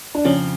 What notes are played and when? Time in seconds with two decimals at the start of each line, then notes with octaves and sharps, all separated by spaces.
0.15 D4
0.25 F2 C#3 F3 C#4